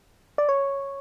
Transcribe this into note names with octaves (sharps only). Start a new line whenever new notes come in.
D5
C#5